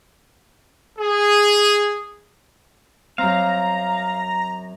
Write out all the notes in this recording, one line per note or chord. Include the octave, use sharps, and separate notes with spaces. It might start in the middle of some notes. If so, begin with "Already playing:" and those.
G#4
F#2 C4 F5 A#5